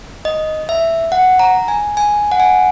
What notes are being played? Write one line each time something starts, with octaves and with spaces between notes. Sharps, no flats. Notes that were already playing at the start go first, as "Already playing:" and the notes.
D#5
E5
F#5
A#5
G#5
G#5
F#5
G#5